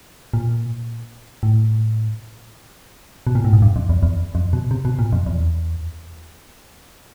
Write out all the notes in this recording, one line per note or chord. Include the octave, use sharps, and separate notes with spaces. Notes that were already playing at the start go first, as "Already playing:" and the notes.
A#2
A2
B2
A#2
A2
G#2
G2
F2
E2
E2
F2
B2
C3
B2
A#2
F2
E2